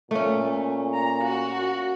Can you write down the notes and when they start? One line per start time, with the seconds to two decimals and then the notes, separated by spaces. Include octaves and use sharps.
0.11 A#2 A3 C#4
0.94 A#5
1.24 F#4